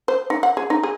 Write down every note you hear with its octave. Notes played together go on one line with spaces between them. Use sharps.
C5
D#4
F#5
G#4
D#4
G#4